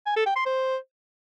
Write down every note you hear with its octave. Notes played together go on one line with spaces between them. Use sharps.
G#5
A4
G5
C6
C5